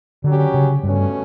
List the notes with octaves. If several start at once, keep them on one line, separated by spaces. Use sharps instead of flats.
D3 F#3 C#4 G4
C#3
G2 B2 A3 C#4